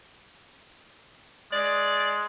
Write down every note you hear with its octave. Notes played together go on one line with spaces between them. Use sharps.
G#3 D5